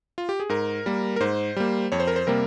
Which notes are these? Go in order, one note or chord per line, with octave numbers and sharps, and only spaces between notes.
F4
G4
G#4
G#2 A#4
G3 A#3
A#4
G#2 C5
G3 A#3
F2 C#5
C5
A#4
C5
C3 G3 A#3 A#4